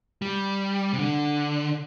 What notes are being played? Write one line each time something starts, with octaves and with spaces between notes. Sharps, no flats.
G3
C3
D3